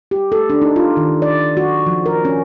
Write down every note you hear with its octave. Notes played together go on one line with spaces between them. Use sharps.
G4
A4
D4
D#4
F4
D#3
D5
F#4
F3
A#4
C#4